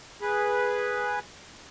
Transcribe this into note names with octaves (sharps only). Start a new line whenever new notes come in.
G#4 B4